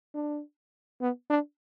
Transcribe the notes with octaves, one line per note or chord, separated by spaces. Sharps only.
D4
B3
D4